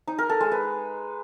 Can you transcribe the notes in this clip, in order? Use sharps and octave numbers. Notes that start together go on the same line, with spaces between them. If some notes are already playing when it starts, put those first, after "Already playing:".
D#4
A#4
A4
G#3
B4